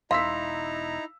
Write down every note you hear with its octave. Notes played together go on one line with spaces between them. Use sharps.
E1 D#4 E4 F5 A#5 C6 E6 B6